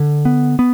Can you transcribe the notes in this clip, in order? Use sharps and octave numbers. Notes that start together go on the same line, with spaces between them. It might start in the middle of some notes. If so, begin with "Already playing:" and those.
Already playing: D3
B3
B3